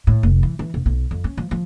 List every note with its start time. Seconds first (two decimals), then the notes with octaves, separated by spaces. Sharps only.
0.07 A2
0.23 F1
0.43 E3
0.59 E3
0.74 E1
0.86 B1
1.11 F2
1.24 C#4
1.37 F3
1.51 F3